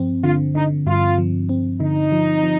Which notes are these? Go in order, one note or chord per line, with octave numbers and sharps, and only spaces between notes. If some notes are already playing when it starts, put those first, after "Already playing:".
Already playing: G2 F3 C4
D3 F4
D3 D#4
G2 F4
F3
C4
D3 D#4
F3
F3